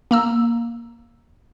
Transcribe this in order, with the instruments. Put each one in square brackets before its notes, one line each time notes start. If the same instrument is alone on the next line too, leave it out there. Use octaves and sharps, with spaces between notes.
[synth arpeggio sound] A#3 A#5 E6